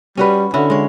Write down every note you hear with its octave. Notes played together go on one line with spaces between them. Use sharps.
G3 C#4 F#4 B4
D3 C#4 E4 F#4
G#3 C#5